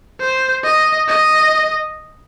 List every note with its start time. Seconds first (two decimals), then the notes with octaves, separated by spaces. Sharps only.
0.20 C5
0.64 D#5
1.08 D#5